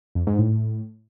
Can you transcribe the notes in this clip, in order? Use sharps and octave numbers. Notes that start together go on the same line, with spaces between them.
F2
G#2
A2